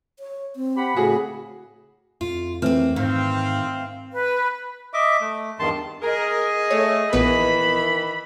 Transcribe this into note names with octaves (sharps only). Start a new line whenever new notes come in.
C#5
C4
G4 F#5 B5
A2 C#3 A3 F#4 G#4
F2 F4
E3 A3 A#3 C4 F6
G#2 D#3 C4 F5
B4
D#5 E5 D6
A3
E2 G2 D#3 A5 C6
G#4 A#4 D#5
A3 C#5
A#1 D#3 E3 B3 B4 B5